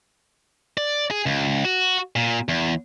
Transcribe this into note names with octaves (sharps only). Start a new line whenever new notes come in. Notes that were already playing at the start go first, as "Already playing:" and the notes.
D5
G#4
C#2
F#4
A#2
E2